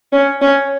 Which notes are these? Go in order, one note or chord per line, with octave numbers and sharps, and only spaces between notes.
C#4
C#4